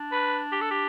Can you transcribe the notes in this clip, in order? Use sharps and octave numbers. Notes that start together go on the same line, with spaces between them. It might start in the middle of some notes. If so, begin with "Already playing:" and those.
Already playing: D4
B4
G4
A4
G4